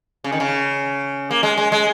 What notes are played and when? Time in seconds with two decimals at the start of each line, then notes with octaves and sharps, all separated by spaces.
0.24 C#3
0.32 D#3
0.40 C#3
1.31 A#3
1.43 G#3
1.58 G#3
1.72 G#3